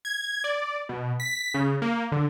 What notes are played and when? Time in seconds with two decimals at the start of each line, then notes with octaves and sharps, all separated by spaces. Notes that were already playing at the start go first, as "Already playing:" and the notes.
0.05 G#6
0.44 D5
0.89 B2
1.20 B6
1.54 C#3
1.82 A#3
2.12 D3